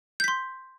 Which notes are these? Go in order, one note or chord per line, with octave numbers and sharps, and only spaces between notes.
C6 G6 B6